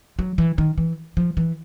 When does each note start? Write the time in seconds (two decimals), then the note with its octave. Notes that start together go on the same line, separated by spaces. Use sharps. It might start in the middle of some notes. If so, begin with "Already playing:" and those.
0.19 F#3
0.38 E3
0.58 D#3
0.78 E3
1.17 F3
1.37 E3